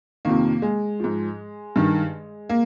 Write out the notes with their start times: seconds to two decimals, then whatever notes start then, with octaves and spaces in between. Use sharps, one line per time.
0.25 F2 C3 D#3 A#3
0.62 G#3
1.00 G#2 F3
1.76 G2 D#3
2.49 A#3